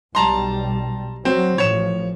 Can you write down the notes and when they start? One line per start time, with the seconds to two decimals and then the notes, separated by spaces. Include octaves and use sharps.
0.15 B1 G3 A5 A#5 C6
1.25 F#3 C4
1.58 A1 A2 F3 C#5 E7